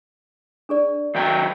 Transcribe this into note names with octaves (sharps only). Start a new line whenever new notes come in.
D4 G#4 D5
D#3 F#3 G5